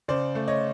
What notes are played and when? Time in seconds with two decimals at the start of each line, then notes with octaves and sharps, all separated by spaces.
0.08 C#3 C5 D5
0.35 A3
0.48 C#5 D#5